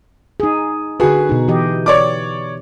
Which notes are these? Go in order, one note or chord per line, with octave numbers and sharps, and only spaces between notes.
D#4 G#4
D3 F#4 G#4 B4
B2 D#4
E3 G4 D#5
C#5 D5 D6